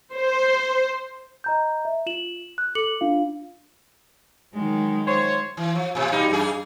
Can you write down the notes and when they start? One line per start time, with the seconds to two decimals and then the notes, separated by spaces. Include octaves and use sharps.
0.15 C5
1.44 D#5 A#5 G6
1.85 E5
2.06 F4 E7 F#7
2.58 F#6
2.75 A4 D6 C#7 F#7
3.01 D4 F4 F5
4.54 D#3 F#3 G#3
5.07 F4 C5 C#5
5.57 E3
5.75 F3
5.95 A2 C3
6.12 B2 G3 D#4
6.31 F#2 G#4